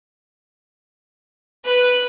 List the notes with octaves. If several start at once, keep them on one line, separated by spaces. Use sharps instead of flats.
B4